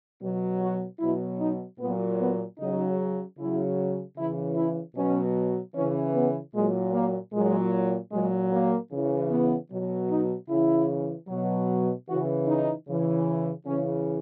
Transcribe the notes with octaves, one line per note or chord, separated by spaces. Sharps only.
B2 F#3
F#4
B2 F#3 E4
D#4
A#2 F#3 B3
B3
C#3 F#3 D#4
C#3 F#3 E4
C#3 E3 E4
E4
B2 F#3 C#4
C#3 E3 C#4
B3
A#2 F#3 G#3
A#3
A#2 F#3 G#3
A#2 F#3 G#3
A#3
C#3 E3
B3
B2 F#3
D#4
C#3 E3 E4
B2 F#3
C#3 E3 F#4
D#4
C#3 E3
C#3 E3 C#4